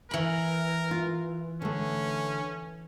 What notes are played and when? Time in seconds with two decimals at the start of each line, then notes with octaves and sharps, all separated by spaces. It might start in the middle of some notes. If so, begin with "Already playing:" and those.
0.11 E3 A#4 B5
0.91 F4
1.62 D3 A3 C#4